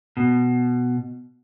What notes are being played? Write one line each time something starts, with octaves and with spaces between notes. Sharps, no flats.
B2